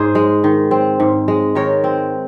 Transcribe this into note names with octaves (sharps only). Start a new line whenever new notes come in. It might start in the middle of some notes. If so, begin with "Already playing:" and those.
Already playing: G#2 G#4 C5
G#3
D#3
C4
G#2
G#3
D#3 A#4 C#5
C4